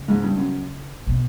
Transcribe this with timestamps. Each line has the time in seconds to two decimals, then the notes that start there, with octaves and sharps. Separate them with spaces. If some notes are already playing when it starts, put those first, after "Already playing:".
Already playing: C#3
0.08 G#2
0.22 G2
0.37 F#2
1.07 B2